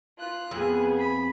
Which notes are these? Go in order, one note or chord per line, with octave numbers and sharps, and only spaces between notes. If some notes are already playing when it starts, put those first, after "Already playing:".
F4 F#6
F2 B3 G#4
B5